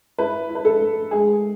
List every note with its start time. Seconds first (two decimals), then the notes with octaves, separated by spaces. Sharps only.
0.19 E4 B4
0.49 E4
0.55 B4
0.65 A4
0.81 A3
1.11 G#3 G#4